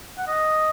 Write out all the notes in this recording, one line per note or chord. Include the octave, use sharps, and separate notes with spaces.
F#5
D#5